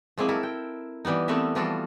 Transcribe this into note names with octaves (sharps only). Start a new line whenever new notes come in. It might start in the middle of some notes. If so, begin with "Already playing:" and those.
F3 F#3 G#3 A#3 C4 E4
E4 A4 A#4
G5
E3 G3 B3 D#4
G3 A3 B3 C4 A#4 E5
E3 F3 G3 F4 F#4 A4